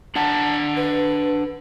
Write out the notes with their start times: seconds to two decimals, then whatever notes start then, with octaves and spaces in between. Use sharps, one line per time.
0.15 D4 F#5 A5 A#5
0.77 B4